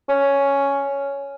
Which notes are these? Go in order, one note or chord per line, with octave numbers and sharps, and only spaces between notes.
C#4